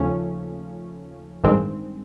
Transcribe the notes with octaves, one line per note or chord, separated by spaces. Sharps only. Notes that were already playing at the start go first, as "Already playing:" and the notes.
Already playing: D#2 C#3 F3 A3 C#4
A1 G2 D#3 G#3 C4